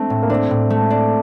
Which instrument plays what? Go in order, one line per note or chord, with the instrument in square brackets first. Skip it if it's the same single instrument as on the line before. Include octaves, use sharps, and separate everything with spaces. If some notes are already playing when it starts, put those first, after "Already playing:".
Already playing: [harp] A3 [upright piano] C4 D4
[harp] A2
[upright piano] A#3
[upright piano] C4 [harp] D4
[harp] A2
A3
D4